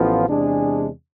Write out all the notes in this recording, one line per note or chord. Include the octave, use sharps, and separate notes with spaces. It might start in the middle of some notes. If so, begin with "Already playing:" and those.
Already playing: A1 A2 F3 B3 F4
E2 C3 G#3 D4 G#4